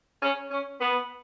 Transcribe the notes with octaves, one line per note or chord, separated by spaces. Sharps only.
C#4
C#4
B3